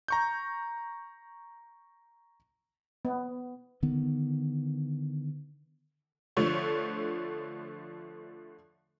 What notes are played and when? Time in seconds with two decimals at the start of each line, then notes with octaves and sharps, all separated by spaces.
0.08 A#5 C#6 G6
3.05 B3
3.83 D3 D#3 B3
6.37 D3 F3 A3 C#5